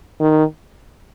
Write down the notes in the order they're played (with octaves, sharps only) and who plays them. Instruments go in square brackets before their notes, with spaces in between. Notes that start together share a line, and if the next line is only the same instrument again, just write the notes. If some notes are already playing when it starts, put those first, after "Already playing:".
[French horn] D#3